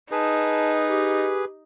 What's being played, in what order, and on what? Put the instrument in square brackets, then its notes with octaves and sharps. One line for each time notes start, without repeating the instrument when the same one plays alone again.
[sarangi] D#4 [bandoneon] G#4 B4 [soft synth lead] A5
[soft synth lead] G4